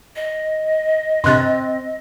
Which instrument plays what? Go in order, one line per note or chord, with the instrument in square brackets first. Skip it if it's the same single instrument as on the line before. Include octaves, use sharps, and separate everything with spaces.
[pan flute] D#5
[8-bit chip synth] G2 C3 [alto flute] C4 [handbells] C6 F#6 A6